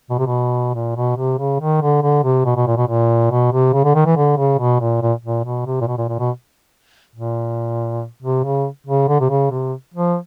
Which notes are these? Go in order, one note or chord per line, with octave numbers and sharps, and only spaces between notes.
B2
C3
B2
A#2
B2
C3
C#3
D#3
D3
D3
C3
B2
B2
A#2
B2
A#2
B2
C3
C#3
D3
D#3
E3
D3
C#3
B2
A#2
A#2
A#2
B2
C3
A#2
B2
A#2
A#2
B2
A#2
C3
C#3
C#3
D3
C3
C#3
C3
F3